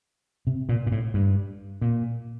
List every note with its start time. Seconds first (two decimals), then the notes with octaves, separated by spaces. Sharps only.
0.47 C3
0.69 A#2
0.87 A#2
0.92 A2
1.14 G2
1.82 A#2